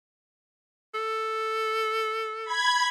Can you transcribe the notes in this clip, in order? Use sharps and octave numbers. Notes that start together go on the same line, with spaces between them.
A4
B5 G#6